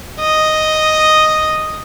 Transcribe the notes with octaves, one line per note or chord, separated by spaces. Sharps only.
D#5